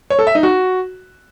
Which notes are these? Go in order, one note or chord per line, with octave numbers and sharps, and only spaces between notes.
C#5
A4
E5
D#4
F#4